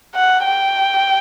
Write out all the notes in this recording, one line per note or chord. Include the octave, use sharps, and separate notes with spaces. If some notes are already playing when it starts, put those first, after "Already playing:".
F#5
G5